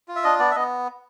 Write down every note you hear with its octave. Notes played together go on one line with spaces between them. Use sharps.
F4
E5
D4 D#5
B3 D5
E5
B3 D#5